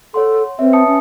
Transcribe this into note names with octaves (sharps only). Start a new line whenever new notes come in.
A4 C#5 F#5 C6
C4 B4 C#5 E5
A5 D#6 C#7
C#4